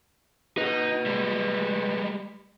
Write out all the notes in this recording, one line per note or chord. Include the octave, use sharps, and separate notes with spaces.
D#4 B4 D#5
G3 G#3